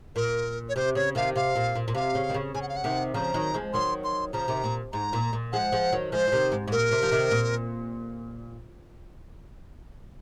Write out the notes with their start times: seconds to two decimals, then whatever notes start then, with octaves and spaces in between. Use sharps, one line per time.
0.16 A#2 A#4
0.69 C#5
0.76 C3 C5
0.95 C#3 C#5
1.15 C3 D#3 F5
1.36 C3 F5
1.56 A#2
1.75 A#2
1.88 A#2
1.95 C3 F5
2.15 C#3
2.30 D#3
2.34 C#3
2.55 C#3 G#5
2.62 F#5
2.69 F5
2.76 F#5
2.84 C3 D#3
3.14 C#3 F3 A#5
3.34 D#3 F#3
3.54 F3 G#3
3.73 D#3 F#3 C6
4.04 C6
4.33 C#3 F3 A#5
4.48 C3 D#3
4.64 A#2
4.93 G#2 A#5
5.13 A#2
5.33 A#2
5.53 F3 G#3 F#5
5.72 F3 G#3
5.92 D#3 F#3
6.12 F3 G#3 C5
6.27 F3
6.32 C3 D#3
6.52 G#2
6.68 G#2
6.72 A#2 A#4
6.91 C3
7.03 F3
7.11 C3 D#3
7.31 A#2